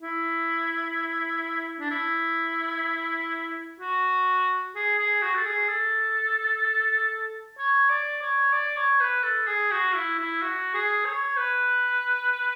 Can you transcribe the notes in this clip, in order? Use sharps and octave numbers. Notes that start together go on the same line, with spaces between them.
E4
D4
E4
F#4
G#4
G#4
F#4
A4
G#4
A4
C#5
D5
C#5
D5
C#5
B4
A4
G#4
F#4
E4
E4
F#4
G#4
C#5
B4